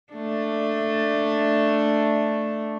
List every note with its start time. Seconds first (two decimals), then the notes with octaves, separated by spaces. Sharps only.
0.13 A3 D4